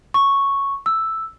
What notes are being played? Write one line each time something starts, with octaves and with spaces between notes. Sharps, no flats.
C#6
E6